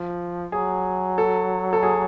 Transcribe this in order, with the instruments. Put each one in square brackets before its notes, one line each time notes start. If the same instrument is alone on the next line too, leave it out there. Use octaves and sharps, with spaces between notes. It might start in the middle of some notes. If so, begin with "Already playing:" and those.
Already playing: [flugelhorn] F3
[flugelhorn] F#3 [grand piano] G#4
[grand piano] A4
A4
G#4